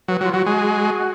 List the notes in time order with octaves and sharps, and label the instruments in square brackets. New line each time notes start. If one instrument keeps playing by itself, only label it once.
[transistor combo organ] F#3 [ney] B4
[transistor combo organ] F#3 [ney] F4
[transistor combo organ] F#3 [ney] F#4
[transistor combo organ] G#3